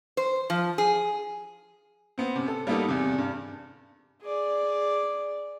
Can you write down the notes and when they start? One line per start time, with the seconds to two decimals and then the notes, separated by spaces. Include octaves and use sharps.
0.17 C5
0.50 F3
0.78 G#4
2.18 B3 C4
2.36 F#2 C3
2.48 A4
2.67 G3 A#3 B3 D#4 A4
2.88 E2 C3
3.18 G2
4.22 G#4 D5